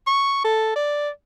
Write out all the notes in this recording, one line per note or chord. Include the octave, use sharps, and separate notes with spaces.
C#6
A4
D5